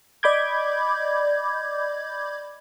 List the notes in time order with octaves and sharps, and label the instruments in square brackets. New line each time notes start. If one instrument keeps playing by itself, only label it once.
[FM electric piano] D5 D#5 B5 D6 G6 G#6